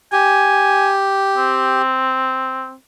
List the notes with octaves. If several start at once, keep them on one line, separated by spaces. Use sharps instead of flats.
G4 G#5
C4